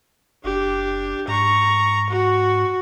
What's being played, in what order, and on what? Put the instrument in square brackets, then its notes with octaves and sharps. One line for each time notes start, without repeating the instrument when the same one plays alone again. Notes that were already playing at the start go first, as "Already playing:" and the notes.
[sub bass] F#1 [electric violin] D4 G4
[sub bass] G#2 [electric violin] A#5 C#6
[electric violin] F#4